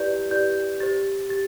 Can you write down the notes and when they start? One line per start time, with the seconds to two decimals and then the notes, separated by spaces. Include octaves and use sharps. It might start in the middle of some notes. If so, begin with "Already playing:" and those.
Already playing: E4 G4 B4 D5 G6
0.31 E4 G4 B4 D5 G6
0.80 G4 C5 A6
1.29 G4 A6